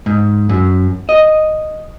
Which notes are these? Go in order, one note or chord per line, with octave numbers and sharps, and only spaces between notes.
G#2
F#2
D#5